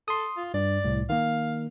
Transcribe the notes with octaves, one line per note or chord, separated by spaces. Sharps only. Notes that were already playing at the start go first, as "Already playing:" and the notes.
A4 C6 D#6
F4
G2 D5
C2 A2
D#3 A#3 F5